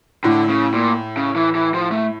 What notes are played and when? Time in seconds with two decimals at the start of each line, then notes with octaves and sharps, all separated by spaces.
0.24 A2 D3
0.49 C#3
0.74 A#2
1.17 C#3
1.36 E3
1.55 E3
1.74 F3
1.92 A3